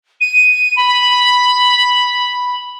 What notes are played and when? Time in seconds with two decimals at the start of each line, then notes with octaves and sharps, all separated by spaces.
0.20 D#7
0.76 B5